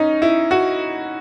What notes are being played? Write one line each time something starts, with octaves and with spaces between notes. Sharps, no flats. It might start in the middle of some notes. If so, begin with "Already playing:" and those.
Already playing: C#4 D#4
E4
F#4